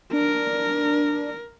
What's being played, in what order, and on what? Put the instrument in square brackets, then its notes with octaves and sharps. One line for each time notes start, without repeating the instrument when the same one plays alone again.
[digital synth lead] D4 [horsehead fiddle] A#4